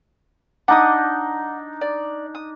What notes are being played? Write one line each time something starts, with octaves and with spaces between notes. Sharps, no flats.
D4 D#4 F#5 D6 D#6
D5
D#6